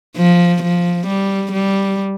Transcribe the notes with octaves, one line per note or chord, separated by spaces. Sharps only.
F3
F3
G3
G3